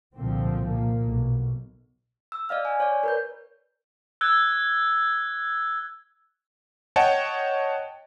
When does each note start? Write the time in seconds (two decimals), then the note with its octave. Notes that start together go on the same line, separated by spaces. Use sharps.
0.16 C2 A#2 D3 F3 C4
0.68 A#2 A#3
1.03 B1
2.32 E6
2.49 D5 D#5 F5 F6
2.65 G#5
2.80 C#5 D5
3.04 A#4 B4 G6
4.21 E6 F#6 G#6
6.96 C#5 D#5 F#5 G5 A5